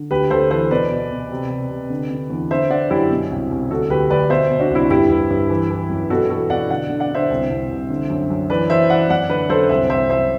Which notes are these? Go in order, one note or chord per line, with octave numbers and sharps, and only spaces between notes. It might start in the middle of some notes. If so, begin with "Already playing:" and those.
Already playing: D3
D2 G4 B4
D2 A4 C5
E3 A4 C5
B2 B4 D5
B2
B2
C3
C3
C3
D3
D3
E2
D3 C5 E5
D3 D5 F#5
F#2 E4 G4
B2
C2
C2
D2 F#4 A4
D2 G4 B4
D2 B4 D5
B2 C5 E5
B2
D4 F#4
C2 E4
G2 E4 G4
G2
G2
E3
E3
F#2
B2 F#4 A4
E2 F#4 A4
B2 D5 F#5
D3 D5 F#5
D3
D5 F#5
D3 C5 E5
C2
C2
C2
D3
F#2
F#2
E3 B4 D5
E3 C5 E5
E3 D5 F#5
F#2 D5 F#5
D3 B4 D5
F#2 A4 C5
C2 C5 E5
C2 C5 E5
C2 C5 E5